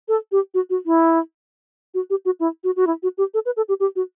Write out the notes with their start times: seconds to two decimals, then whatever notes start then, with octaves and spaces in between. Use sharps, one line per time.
0.08 A4
0.32 G4
0.54 F#4
0.70 F#4
0.86 E4
1.94 F#4
2.10 G4
2.25 F#4
2.40 E4
2.64 F#4
2.76 F#4
2.87 E4
3.03 F#4
3.18 G4
3.34 A4
3.46 B4
3.57 A4
3.69 G4
3.80 G4
3.96 F#4